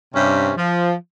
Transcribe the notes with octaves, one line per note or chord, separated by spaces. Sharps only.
G2 C3 C#4
F3